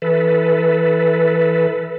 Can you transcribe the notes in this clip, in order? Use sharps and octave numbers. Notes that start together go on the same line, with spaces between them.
E3 A4 B4